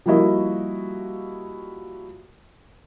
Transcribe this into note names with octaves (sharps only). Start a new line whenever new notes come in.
F3 G3 A#3 E4 F#4 D#5